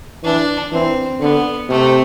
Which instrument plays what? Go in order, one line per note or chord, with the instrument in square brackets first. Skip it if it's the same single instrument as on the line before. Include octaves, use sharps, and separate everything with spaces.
[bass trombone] E3 [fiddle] D4
[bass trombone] E3 [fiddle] C4
[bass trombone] D3 [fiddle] B3
[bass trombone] C3 [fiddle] A3